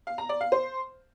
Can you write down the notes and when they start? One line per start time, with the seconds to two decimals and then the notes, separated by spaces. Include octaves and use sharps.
0.07 F5
0.18 A#5
0.29 D5
0.41 F5
0.52 C5